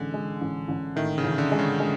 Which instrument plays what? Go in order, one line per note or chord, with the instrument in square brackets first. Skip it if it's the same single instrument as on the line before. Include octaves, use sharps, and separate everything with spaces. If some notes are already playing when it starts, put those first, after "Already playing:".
Already playing: [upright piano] A1 G#3 [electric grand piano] D3
[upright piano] G#3
A1
A1
[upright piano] A2 [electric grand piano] D#3
[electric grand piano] C#3
[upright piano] A1
[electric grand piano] D3
[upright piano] G#3
[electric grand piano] C#3
[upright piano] G#3